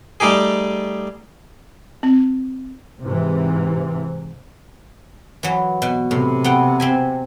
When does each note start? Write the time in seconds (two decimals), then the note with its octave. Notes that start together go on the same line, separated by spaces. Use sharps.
0.20 G3 A3 D#4 G4 G#4
2.03 C4
3.02 G#2 C3 E3
5.43 E3 F#3
5.82 B2
6.11 A2 C3
6.44 B3 F#5 G5
6.80 C4 E5 G#5